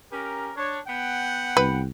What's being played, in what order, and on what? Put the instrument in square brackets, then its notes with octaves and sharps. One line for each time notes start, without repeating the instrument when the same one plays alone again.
[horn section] C#4 G4 A#4
D4 C#5
B3 F#5 G5
[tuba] C2 [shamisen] B4